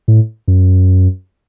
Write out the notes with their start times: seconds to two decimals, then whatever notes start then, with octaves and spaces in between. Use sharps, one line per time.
0.08 A2
0.48 F#2